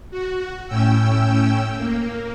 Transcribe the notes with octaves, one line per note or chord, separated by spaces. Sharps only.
F#4
A2 C#4 G5 E6
A#3